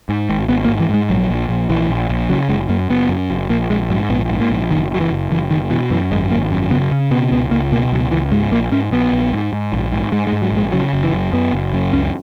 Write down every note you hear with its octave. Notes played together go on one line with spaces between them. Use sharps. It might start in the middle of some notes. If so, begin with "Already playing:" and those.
G#2
G#1
G#1 B3
A#3
G#2
E3
G#2 G#3
A#1 F#3
A#1
A#1
A#1 E3
A#1
A#1
C#3 F#3
F#1 G#3
F#2 A#3
F#1 B3
F#2
F#1
A#1 A#3
A#1 G#3
G#2 F#3
A#1 B3
G#2
A#3
A#1
F#1 D#3
F#1 F#3
E3
F#1
F#1 E3
F#1 D#3
B2 E3
F#2 E3
G#1 G#3
G#1 A#3
F#2
C#3 B3
C#3 C#4
B2 B3
C#2 B3
C#2 A#3
B2 A#3
C#2 F#3
C#2 E3
G#2 G#3
A#1 A#3
G#2 C#4
A#1 B3
A#1
G#2
G#2
A#1
G#2
G#2 G#3
G#3
G#2
F#3
A#1
G#3
C#3 F#3
F#1
E3
F#2
F#2 B3
F#1
F#2
C#2 C#4